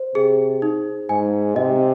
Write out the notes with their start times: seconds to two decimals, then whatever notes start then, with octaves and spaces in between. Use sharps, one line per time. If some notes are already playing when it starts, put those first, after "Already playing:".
Already playing: C5
0.15 C3 G#4
0.62 D#4
1.09 G#2 G#5
1.56 C3 D#5